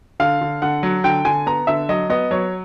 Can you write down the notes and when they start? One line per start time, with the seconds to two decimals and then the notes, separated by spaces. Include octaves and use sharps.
0.20 D3 F5
0.41 D3
0.62 D3 F#5
0.83 F#3
1.04 D3 G5
1.25 D3 G#5
1.46 B3 A#5
1.67 D3 E5
1.89 F#3 D#5
2.10 B3 D#5
2.31 F#3 C#5